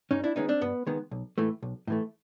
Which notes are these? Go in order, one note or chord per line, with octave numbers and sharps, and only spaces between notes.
G2 C#4 D#4
D4 E4
D#3 G#3 B3 C#4 D#4
C4 D4
G2 B3
D#3 G#3 B3
B1
A2 E3 A3
B1
A2 E3 A3